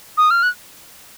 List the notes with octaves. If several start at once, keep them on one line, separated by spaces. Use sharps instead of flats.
D#6
F6
F#6